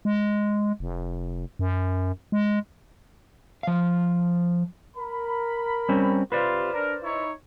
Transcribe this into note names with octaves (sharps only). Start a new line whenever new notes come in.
G#3
F1
F#2
G#3
F3 F5
A#4 B5
G3 C4 C#4
C3 F4 B4 C5 D5
D4 A#4
D#4 E4 C#5